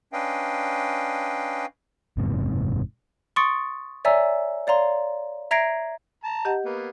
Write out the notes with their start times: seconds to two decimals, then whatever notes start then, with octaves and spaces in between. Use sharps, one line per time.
0.13 C#4 D4 B4 D#5 F5 G5
2.17 F#1 E2 G#2 C3
3.36 C6 C#6 D#6 A6 C#7 D7
4.05 C#5 D5 E5 G#5 A#5 E6
4.67 C#5 D5 F5 A#5 C6
5.51 E5 A#5 G#6 A#6 C7 D7
6.24 A5 A#5
6.45 G4 D#5 F#5
6.65 A#3 B3